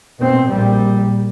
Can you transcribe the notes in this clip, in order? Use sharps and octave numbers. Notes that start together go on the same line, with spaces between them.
B2 C4
A#1 G3